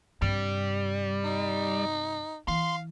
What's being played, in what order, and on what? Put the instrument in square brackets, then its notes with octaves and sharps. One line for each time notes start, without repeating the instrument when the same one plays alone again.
[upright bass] G2 C3 [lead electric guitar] G3
[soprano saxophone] D#4
[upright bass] E3 [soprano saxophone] F5 [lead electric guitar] C6